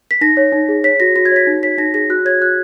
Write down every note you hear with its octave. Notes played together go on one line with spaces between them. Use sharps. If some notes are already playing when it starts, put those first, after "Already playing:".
B6
D#4 A#6
C#5
D#4
G#4
C#5 B6
F#4 A#6
F#4 A#6
G#6
C#5 B6
D#4
C#5 B6
D#4 A#6
G#4 A#6
F#4 F#6
C#5 G#6
F#4 F#6